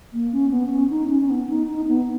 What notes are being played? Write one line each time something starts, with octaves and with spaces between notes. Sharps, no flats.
A#3
C#4
B3
C#4
D#4
C#4
C#4
B3
D#4
D#4
B3